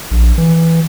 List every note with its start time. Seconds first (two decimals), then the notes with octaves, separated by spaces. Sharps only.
0.11 A#1
0.38 E3